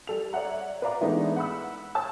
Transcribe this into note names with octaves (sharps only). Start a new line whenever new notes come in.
G3 A4 F7
C#5 D5 E5 F#5 A#5
B4 D5 F5 A#5 D6
E3 G#3 A3 B3 D4 D#4
F#5 B5 E6
C#5 A5 E6